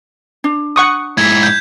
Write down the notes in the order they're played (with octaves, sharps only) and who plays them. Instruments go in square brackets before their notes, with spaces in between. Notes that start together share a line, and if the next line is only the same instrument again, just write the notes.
[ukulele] D4
[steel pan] F#5 C#6 D#6
[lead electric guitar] G#2 E4 [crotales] G#6 B6
[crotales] G6